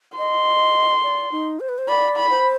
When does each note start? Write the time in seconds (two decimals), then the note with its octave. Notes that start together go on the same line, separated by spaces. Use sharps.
0.18 D#5 C6
1.03 D5
1.32 D#4
1.60 C5
1.69 B4
1.78 C5
1.88 D5 B5
2.17 B5
2.31 C5